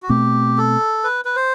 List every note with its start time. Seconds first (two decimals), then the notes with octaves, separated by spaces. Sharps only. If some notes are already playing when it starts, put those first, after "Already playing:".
0.03 F#4
0.09 B2 A3 C4 G4
0.58 A4
1.04 B4
1.25 B4
1.36 C5